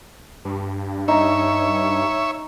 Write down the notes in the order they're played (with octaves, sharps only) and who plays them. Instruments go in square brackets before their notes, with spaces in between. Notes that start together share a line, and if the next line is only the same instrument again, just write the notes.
[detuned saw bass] G2
[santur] D#4 [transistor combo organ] C#5 E5